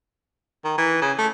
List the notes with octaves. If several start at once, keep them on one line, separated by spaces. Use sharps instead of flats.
D#3
E3
C#3
A3